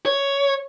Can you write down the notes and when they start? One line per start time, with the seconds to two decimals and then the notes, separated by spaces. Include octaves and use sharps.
0.06 C#5